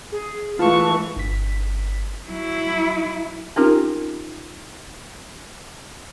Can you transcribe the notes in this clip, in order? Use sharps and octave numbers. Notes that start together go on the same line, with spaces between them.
G#4
E3 G#3 A3 F4 A5 C#6
G1 B6
F#3 E4
C4 C#4 D#4 F4 G4 A#4